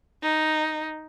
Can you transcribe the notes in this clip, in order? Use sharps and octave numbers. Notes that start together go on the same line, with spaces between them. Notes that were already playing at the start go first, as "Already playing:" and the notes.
D#4